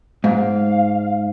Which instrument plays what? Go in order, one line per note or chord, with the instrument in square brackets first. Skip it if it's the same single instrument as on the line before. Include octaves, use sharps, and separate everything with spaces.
[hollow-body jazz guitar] G#2 [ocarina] F5